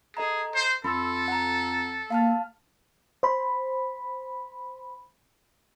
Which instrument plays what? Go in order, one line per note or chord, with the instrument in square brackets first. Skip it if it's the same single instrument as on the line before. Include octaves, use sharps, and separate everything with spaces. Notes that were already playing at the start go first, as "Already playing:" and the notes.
[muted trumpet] G#4 [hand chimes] A4 D#5 A#5
[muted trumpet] C5
[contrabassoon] F2 [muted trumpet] A4 [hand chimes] B5 C6 E6
[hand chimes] F#5 G#5 A#5
[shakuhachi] A#3 [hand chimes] F5 A5 F6
[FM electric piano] C5 B5